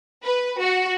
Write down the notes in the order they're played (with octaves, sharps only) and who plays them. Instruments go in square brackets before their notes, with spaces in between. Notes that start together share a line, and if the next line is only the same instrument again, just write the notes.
[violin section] B4
F#4